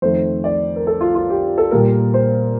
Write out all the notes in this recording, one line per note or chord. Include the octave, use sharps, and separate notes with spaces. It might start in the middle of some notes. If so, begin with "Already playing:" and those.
F2 D#3 A3 C5
D5
A#4
A4
F4
F4
G4
A4
A#2 G3 A#3 A#4
C5